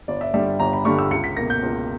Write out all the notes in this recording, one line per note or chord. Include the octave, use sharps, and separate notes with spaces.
G1 D5
E5
G2 D3 G3 E5
G1 A#5
B5
G2 D3 G3 C#6
E6
C#2 C#7
B6
B2 A#3 A#6
G6
C#2